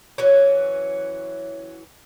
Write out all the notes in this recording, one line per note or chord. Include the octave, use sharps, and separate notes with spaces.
E3 F#3 C#4